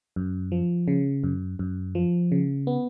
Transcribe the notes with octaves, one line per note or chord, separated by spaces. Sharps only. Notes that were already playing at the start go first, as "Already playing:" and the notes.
F#2
F3
C#3
F#2
F#2
F3
C#3
B3